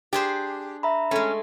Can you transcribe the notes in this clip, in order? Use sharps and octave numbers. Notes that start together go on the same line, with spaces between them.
D4 G4 G#4 C5
E5 A#5 B5
G#3 A3 C#4